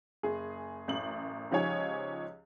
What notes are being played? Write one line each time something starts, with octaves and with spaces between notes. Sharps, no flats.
F#1 G#4
A1 F#2 F#7
C#2 F3 D#4 G4 C#5 G#5